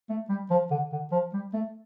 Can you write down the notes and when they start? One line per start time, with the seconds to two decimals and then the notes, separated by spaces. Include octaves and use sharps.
0.09 A3
0.29 G3
0.50 F3
0.71 D3
0.92 D3
1.12 F3
1.33 G3
1.53 A3